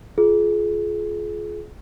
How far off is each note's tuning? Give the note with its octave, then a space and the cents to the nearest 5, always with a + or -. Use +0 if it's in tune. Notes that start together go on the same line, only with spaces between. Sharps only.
F4 +0 G#4 +30